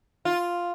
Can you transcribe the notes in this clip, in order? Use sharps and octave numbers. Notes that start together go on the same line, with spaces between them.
F4